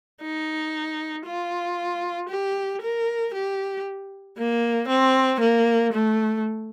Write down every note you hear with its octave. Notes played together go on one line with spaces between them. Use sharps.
D#4
F4
G4
A#4
G4
A#3
C4
A#3
A3